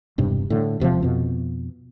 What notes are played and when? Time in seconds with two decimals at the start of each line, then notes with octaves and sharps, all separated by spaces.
0.18 E1 G2 C3
0.50 A2 D3
0.80 E1 C3 E3 F3
1.03 F2 B2